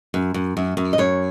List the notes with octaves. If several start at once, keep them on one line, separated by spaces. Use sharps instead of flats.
F#2
F#2
F#2
F#2
D#5
F#2 C#5